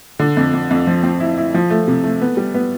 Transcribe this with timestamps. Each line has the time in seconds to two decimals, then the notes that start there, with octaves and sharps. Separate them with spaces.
0.19 D3
0.37 F2
0.53 F2
0.71 F2
0.87 F3
1.03 C4
1.20 E4
1.37 E4
1.54 F3
1.70 A3
1.88 C3
2.04 A3
2.21 B3
2.37 G3
2.55 B3